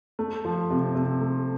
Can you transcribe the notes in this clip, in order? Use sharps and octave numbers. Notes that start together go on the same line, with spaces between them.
A3
F3
C3
C3
A3